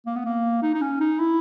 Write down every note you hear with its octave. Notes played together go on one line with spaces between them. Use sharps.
A#3
B3
A#3
D#4
D#4
C#4
D#4
E4